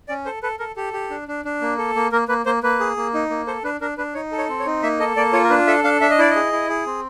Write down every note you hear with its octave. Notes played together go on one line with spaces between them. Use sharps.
C#4 D5
A4 C5
A4 B4
A4 A#4
G4 A4
G4
D4
D4
D4
A#3
A4
A#3
A#3 A#4
A#3 B4
A#3 C5
A#3 B4
G#4
A#3
D#4
A#3
A4 C5
D4 B4
D4 A#4
D4 B4
D#4 C#5
A4
C#5
C4
C#5
D#4
A#3 E5
A4 D#5
A#3 D5
F4 C#5
A#4
D4 B4
A4 E5
D4 F5
D4 E5
D#5
E4 D5
G#4 D#5
E4
G#4
C4